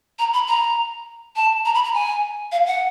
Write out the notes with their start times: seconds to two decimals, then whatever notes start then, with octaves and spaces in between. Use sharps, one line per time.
0.19 A#5
0.34 B5
0.47 A#5
1.36 A5
1.65 A#5
1.74 B5
1.84 A#5
1.94 G#5
2.52 F5
2.67 F#5